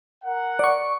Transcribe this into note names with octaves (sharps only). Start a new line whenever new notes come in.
A#4 F#5
D5 C#6